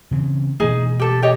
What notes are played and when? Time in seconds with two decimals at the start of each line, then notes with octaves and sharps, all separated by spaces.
0.11 C#3 E3 C4
0.60 B2 E3 A3 D#4 G#4
1.00 G4 A4
1.22 G4 C#5 D#5